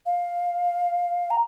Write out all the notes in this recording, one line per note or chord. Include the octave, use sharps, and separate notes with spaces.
F5
A#5